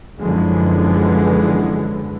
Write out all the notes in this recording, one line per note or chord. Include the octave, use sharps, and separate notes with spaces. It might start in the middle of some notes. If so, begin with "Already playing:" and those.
F#2 D3 E3 F3 G#3 B3